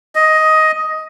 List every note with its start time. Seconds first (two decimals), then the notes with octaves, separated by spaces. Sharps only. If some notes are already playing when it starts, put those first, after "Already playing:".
0.15 D#5